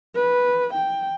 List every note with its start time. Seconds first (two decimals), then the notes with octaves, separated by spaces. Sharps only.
0.15 B4
0.74 G5